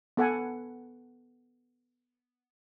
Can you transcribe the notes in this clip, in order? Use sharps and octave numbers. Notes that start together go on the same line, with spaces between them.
B3 A4 F#5 G#5